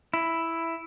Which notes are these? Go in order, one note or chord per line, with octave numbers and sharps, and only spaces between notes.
E4